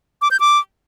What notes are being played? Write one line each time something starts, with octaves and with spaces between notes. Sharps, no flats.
D6
G6
D6